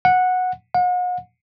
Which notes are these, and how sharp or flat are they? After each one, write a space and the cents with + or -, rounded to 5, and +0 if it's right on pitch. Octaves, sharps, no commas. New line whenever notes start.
F#5 -10
F#5 -40